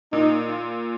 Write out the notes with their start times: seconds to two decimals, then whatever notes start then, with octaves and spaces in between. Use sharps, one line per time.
0.12 A#2 D#4
0.49 F4